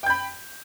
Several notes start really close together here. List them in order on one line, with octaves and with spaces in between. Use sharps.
G5 G6 B5